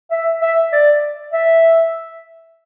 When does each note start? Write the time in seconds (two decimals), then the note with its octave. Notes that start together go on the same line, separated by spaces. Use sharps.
0.11 E5
0.42 E5
0.73 D5
1.33 E5